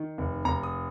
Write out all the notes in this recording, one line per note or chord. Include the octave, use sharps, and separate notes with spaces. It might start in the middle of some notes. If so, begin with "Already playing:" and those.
Already playing: D#3
F1
F1 A#5
D#6